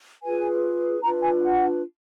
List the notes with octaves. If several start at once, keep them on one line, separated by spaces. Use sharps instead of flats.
F4 G#4 B4 G#5
D4 F4 B4 A#5
G#5
F#5